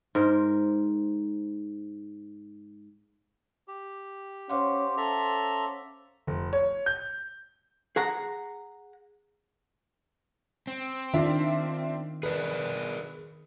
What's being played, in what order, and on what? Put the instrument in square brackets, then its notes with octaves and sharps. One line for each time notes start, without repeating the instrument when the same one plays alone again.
[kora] G#2 A#4 C5
[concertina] G4
[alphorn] C#4 [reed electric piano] C5 F5 F#5 [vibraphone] C6 D6
[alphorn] C#4 [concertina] A4 E5 A#5
[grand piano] F1
C#5
G6
[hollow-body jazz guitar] G#4 F#5 A#5
[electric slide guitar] C4
[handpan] D#3 [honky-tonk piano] D4 F4 E5
[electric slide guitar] G#4 A#4 D5 [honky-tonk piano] B4